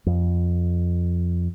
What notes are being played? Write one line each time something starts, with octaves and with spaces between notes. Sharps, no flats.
F2